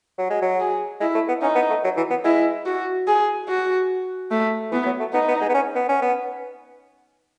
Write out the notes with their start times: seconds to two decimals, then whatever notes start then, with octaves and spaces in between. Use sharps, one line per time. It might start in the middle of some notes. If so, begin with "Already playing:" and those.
0.18 F#3
0.30 G#3
0.42 F#3
0.60 G#4
1.00 G#3 E4
1.15 A3
1.28 B3
1.42 C#4 D#4
1.55 B3
1.70 A3
1.84 F#3
1.97 E3
2.10 B3
2.25 G#3 E4
2.66 F#4
3.07 G#4
3.49 F#4
4.31 A3
4.72 E3 B3
4.85 F#3
5.00 A3
5.13 B3 D#4
5.28 B3
5.41 G#3
5.49 B3
5.54 C#4
5.75 B3
5.89 C#4
6.02 B3